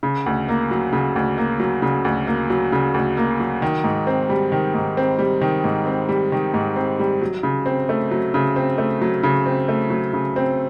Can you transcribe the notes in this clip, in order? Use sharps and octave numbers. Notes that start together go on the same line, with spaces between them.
C#3
D2
A#3
F#3
C#3
D2
A#3
F#3
C#3
D2
A#3
F#3
C#3
D2
A#3
F#3
D#3
G#2
C4
G3
D#3
G#2
C4
G3
D#3
G#2
C4
G3
D#3
G#2
C4
G3
F#3
C#3
C4
A3
F#3
C#3
C4
A3
F#3
C#3
C4
A3
F#3
C#3
C4